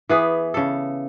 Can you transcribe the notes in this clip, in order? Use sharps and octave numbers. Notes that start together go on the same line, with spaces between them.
E3 B3 G#4
C#3 A4